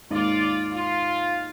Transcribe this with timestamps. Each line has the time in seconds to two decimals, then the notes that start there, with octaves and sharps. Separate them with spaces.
0.10 D#2 G#2 F4 D5
0.72 F4